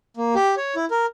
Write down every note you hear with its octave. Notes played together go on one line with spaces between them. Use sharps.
A#3
G4
C#5
E4
A#4